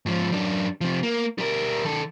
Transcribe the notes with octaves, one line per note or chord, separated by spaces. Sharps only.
G#2 F3
F#2 D4
C3 F3
A#3
G3 A#4
D#3 A4